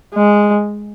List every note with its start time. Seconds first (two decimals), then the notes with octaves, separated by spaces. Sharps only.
0.15 G#3